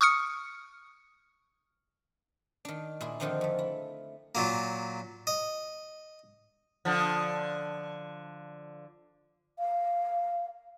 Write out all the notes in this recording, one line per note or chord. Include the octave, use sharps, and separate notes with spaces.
C#6 D#6 F6 C#7
D#3 D4
A#2 E4 G#4
D3 D#3 F3 C4 D4 D#4
F2 A3
E4
A#2 F#3 A#3
D#5
D3 F3
F5